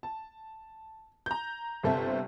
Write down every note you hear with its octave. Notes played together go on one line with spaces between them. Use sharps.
A5
A#5 G6
G1 C3 A4 C5 E5